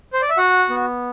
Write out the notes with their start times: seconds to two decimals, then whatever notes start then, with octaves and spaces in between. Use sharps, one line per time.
0.13 C5
0.21 D5
0.30 E5
0.37 F#4 F#5
0.70 B3